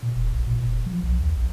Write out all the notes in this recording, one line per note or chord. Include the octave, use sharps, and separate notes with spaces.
A#2
E1
A#1
A#2
F1
F3
B1
D#2
A#1